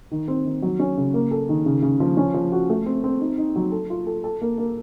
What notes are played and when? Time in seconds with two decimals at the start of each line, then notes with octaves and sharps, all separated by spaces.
0.11 D#3
0.28 C4
0.45 D#3
0.62 F#3
0.79 C#4
0.97 C#3
1.14 A#3
1.31 A4
1.49 D#3
1.66 C#3
1.82 C#3
2.00 F3
2.17 C#4
2.34 F3
2.52 F#4
2.70 A3
2.86 C4
3.04 C4
3.21 D#4
3.38 D#4
3.56 F#3
3.72 A4
3.90 F4
4.06 A4
4.24 A4
4.41 A#3
4.58 A#3